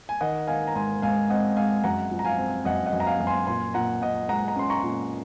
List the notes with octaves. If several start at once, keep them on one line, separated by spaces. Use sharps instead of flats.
G#5
D#3 D#5 F#5
D#3 F5 G#5
A#5
G#2 G#5 C6
G#2 F5 G#5
C4 D#5 F#5
G#3 F5 G#5
F#2 F#5 A#5
F3
A#5
F5 G#5
C4
F#2 D#5 F#5
D#5 F#5
F#2
A#5
F5 G#5
F#2
G#5 C6
A#2 G#5 C6
A#2 F#5 A#5
A#2 D#5 F#5
G#3 F#5 A#5
A#5
C#4 C6
A#5 C#6
A#2